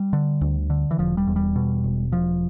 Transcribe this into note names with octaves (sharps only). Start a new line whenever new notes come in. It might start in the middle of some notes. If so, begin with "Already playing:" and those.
Already playing: G3
D3
D2
D3
E3
E1 F3
G3
E2
G3
B2
E1
E1 F3